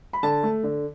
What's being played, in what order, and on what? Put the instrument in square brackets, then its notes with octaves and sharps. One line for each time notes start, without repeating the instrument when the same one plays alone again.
[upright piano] B5
D3 A5
A3
D3